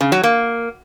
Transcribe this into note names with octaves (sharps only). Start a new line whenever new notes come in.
C#3
F#3
A#3